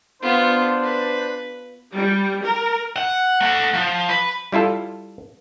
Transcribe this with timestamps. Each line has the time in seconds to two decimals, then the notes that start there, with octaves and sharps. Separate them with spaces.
0.22 B3 D4 F4 C5
0.83 B4
1.94 G3
2.43 A#4
2.96 F#5
3.41 A3 F#5
3.74 F3
4.09 B4
4.52 G3 E4 F4 A4